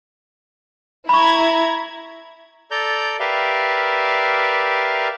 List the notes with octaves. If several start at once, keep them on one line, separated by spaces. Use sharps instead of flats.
E4 A#5 B5 C#6 G#6
A4 D5 A#5 G6
G4 A#4 B4 D5 E5 F5